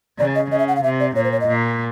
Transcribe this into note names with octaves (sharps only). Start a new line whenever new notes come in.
C#3 D5
D#5
C#3 D#5
E5
F#5
F5
C3 E5
D5
A#2 C#5
C5
C#5
D#5
A#2